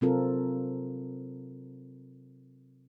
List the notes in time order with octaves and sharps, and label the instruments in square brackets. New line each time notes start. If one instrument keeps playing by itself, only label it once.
[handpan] C3 F#3 C4 F4 A4 A#4